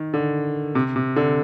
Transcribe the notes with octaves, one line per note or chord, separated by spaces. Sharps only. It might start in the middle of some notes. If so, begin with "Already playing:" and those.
Already playing: D#3
D3
C3
C3
D3